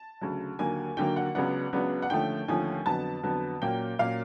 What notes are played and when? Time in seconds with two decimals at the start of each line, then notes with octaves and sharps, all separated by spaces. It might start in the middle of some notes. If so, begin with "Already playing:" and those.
Already playing: A5
0.21 D2 C#3 F#3
0.59 D#2 D3 F#3 A#3 G#5
0.97 D#2 D3 F#3 A#3 G5
1.16 F#5
1.35 C#2 C#3 F#3 B3 D4 F#5
1.73 C#2 C#3 F#3 B3 D4
2.02 F#5
2.10 D#2 D3 F3 A3 C#4 G5
2.48 D#2 D3 F3 A3 C#4 G#5
2.86 F2 D3 F#3 B3 A5
3.23 F2 D3 F#3 B3
3.61 A#2 F#3 A#3 C#4 G5
3.99 A#2 F#3 A#3 C#4 F5